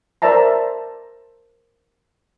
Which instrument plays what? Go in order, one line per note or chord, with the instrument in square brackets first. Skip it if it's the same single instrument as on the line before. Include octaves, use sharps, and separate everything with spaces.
[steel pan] A#4 C5 D5 E5 A5 A#5